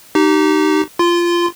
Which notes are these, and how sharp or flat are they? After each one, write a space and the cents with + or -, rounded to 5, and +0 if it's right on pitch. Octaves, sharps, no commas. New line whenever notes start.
D#4 -15 G4 -25
F4 -15 C6 -15